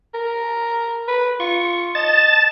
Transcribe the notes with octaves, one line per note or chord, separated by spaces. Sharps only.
A#4
B4
F4 C#6
D#5 A5 A6